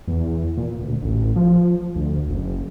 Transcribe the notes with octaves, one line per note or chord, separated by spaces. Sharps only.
E2
A#2
D2
A1
F3
D2
F#1